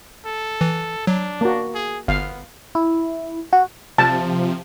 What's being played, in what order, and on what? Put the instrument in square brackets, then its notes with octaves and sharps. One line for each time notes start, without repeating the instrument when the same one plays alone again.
[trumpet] A4
[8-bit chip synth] E3
[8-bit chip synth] F#3 [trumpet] D4
[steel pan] A#3 F#4
[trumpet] G#4
[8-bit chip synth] G1 [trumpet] B3 [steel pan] F5
[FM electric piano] E4
F#4
[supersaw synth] C3 F3 [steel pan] A5